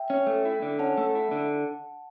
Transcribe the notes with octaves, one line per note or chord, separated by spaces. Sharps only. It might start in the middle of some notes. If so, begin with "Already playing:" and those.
Already playing: E5 G5
C#4
A3
E4
D3
C#4 F#5 A5
A3
E4
D3